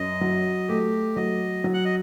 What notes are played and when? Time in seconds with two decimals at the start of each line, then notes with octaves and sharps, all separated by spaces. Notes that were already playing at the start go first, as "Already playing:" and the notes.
Already playing: F#2 D#5
0.21 F#3
0.68 A3 G4
1.16 F#3 D#5
1.64 F#3
1.74 F#5
1.85 D#5